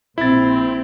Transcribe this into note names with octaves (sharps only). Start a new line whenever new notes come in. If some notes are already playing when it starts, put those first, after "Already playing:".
A#1 C4 E4 A6